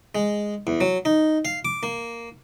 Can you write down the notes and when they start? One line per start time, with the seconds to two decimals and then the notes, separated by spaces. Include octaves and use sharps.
0.15 G#3
0.67 E2
0.81 F#3
1.05 D#4
1.45 F5
1.65 D6
1.83 A#3